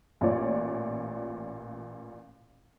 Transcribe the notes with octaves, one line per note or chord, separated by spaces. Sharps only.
A1 A#2 F4 C#5 D5